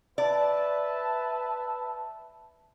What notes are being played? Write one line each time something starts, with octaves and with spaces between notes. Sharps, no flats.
B4 D5 E5 A5